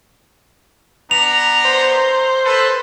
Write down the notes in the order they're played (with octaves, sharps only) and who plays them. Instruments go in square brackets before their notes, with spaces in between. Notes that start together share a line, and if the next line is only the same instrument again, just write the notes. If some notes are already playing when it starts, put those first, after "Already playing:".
[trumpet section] B3 D4 A#5 [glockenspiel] F7
[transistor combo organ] C5
[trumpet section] A4 B4